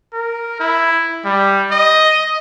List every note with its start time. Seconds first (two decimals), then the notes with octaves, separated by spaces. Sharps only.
0.13 A#4
0.60 E4
1.25 G3
1.71 D#5